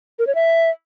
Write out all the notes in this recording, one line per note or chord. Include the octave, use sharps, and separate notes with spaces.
A#4
C#5
E5